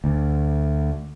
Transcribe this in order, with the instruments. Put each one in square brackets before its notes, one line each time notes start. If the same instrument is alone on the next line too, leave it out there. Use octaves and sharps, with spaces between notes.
[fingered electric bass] D2